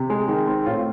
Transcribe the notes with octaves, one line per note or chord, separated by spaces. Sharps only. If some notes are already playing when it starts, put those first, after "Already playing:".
Already playing: C3
G#3
D#3
C4
A2 F4